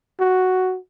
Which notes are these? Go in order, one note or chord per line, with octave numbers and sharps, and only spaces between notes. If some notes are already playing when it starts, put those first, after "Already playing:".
F#4